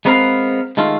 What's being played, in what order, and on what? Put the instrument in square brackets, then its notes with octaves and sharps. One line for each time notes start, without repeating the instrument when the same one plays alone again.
[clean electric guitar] G#3 B3 C4 A#4 B4 F5
D#3 G#3 A3 F4